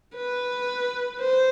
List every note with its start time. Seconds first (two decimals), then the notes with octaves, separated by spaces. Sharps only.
0.17 B4
1.21 C5